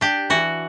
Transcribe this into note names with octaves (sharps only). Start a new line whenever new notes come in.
D4 G4
E3 F#4